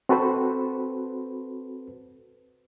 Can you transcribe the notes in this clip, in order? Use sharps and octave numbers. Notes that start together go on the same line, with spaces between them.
C4 F#4 A4 B4 C5